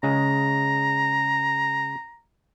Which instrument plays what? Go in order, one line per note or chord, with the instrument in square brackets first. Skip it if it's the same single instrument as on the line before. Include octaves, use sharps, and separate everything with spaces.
[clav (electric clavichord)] C#3 G#3 [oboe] A#5